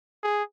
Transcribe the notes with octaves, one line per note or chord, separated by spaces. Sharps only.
G#4